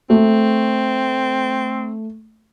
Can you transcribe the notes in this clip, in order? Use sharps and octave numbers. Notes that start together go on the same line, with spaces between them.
A3 C4